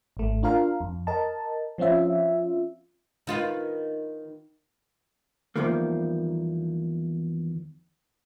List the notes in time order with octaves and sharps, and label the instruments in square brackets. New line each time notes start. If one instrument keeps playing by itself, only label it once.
[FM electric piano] G#1 A3
D4 F4 A#4 F5
F2
A#4 D#5 A5
F3 C4 C#4 F4 E5
[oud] D#3 F4 B4
[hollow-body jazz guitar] E2 A2 D#3 F3 G3 A#3